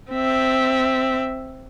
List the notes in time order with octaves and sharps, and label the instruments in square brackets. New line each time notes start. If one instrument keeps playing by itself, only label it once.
[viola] C4 E5